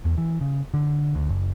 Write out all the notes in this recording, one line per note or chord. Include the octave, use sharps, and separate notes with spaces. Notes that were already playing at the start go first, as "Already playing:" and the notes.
E2
E3
C#3
D3
D2
F#1